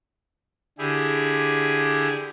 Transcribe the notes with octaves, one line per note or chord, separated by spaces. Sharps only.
D3 E4 G4 G#4